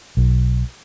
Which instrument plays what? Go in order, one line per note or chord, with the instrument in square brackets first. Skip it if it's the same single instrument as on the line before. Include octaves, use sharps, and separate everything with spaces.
[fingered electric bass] B1